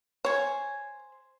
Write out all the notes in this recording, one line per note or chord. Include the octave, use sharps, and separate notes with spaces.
C5 C#5 G#5